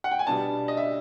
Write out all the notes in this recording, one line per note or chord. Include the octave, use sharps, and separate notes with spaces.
F#5
G5
G#5
B2 G3 B3 D4 A5
D#5
E5